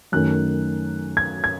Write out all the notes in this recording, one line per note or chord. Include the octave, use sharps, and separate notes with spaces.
F#2 D#3 A3 C#4 F#6
G#6
G#6